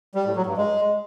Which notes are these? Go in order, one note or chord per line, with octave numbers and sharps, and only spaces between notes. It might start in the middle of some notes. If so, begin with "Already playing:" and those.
G3
A2
F#3
G2
G#3